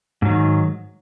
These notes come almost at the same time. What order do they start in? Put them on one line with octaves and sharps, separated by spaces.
G#2 F#3 D#3